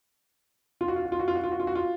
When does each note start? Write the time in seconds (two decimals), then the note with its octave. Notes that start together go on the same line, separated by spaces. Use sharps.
0.81 F4
0.88 F#4
0.96 F4
1.05 F#4
1.12 F4
1.19 F#4
1.28 F4
1.35 F#4
1.44 F4
1.52 F#4
1.60 F4
1.67 F#4
1.75 F4